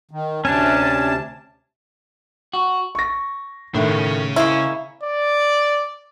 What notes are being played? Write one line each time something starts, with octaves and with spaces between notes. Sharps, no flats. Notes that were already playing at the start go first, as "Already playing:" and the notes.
D#3
D2 C3 C#4 D4 A5
F#4
C#6 A#6
A2 D#3 D4 E5
C#3 C#4
G#3 A#3 E4 C#6
D5